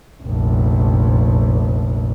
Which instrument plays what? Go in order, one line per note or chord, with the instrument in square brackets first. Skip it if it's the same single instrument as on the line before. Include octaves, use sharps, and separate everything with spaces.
[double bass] F1 A#1